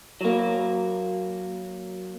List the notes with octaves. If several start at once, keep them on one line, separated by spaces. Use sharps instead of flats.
F#3 A#3